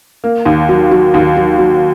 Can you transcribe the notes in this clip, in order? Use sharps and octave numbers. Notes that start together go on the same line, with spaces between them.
A#3
D#2
F#3
F#3
D#2
F#3
F#3